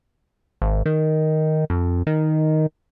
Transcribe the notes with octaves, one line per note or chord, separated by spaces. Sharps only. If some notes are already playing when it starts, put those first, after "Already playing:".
G#1
D#3
F2
D#3